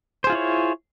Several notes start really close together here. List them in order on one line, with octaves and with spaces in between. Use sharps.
C5 G#4 F4 E4 C#5